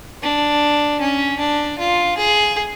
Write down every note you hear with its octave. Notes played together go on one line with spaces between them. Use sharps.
D4
C#4
D4
F4
G#4